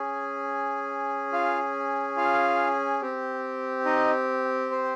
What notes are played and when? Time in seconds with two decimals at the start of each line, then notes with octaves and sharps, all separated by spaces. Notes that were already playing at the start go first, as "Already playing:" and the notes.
Already playing: C#4 G#4
1.32 F4 F5
2.17 F4 F5
3.01 C4 G4
3.85 D#4 D#5
4.71 C5